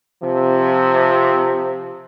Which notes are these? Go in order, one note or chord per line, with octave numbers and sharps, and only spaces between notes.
C3 F3